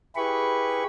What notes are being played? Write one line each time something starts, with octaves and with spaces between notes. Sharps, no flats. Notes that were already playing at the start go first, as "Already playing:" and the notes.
E4 G4 G#4 B4 B5 C#6